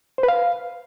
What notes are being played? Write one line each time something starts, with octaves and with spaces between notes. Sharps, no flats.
C5
B4
F5